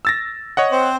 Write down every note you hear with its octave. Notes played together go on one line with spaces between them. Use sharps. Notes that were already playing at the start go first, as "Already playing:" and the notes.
E6 A6 A#6
C#5 D#5 F#5
C4 C5